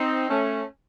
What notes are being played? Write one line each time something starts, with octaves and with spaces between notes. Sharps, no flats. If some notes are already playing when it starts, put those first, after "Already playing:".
Already playing: C4 D#4
A3 C#4